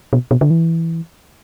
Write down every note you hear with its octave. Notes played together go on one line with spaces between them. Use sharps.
B2
B2
D3
E3